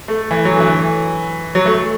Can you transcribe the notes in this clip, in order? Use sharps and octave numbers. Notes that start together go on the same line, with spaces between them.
A3
E3
F#3
D3
E3
F#3
A3